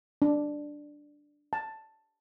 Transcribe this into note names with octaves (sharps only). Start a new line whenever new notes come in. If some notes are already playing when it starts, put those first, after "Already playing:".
D4
A5